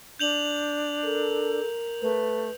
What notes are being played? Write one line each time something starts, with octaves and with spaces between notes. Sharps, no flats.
D4 G6 F7 F#7
A4 A#4
A3 B4